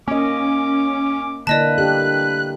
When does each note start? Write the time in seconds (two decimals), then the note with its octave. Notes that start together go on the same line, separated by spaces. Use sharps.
0.08 A#3 C#4 D#5 D6
1.47 D3 A#3 E4 B4 D5 D#5 A5
1.78 D4 G4 A4 F#6